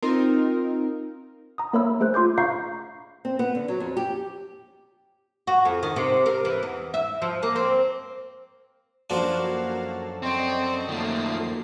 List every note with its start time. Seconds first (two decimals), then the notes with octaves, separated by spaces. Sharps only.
0.02 C4 D#4 F4 A#4
1.58 A#5 D#6
1.73 A#3 A#4 C#5 E5 B5 E6
2.00 A3 G#4 C5 F#6
2.14 F4 C6 D6 G6
2.38 F5 A#5 B5 C#6 G6 C7
3.25 C4
3.39 B3
3.55 D3
3.68 F#3
3.80 F2
3.97 G4
5.47 F#4
5.65 F2
5.83 D#3
5.96 C3
6.26 A#4
6.45 E3
6.63 E2
6.94 E5
7.22 F3
7.43 A#3
7.56 C4
9.10 F#2 F3 A#3 D4 F#4 A4 F5
10.22 C4 D5 D#5 C#6
10.88 D#3 F3 A3 A#3 C7